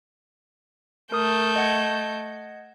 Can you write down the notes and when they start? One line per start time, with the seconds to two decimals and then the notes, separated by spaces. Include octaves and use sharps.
1.12 A3 A#4 D#6 G6
1.56 D#5 F#5 G#6